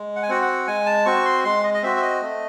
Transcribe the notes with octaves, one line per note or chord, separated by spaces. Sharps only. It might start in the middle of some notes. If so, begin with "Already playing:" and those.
Already playing: G#3
F#5
G#5
C4 F#4 F#5
F#5
G#3 G#5
A5
C4 F#4 C#6
C6
G#3 C6
D#5
D#5
C4 F#4 E5
E5
D#5
A3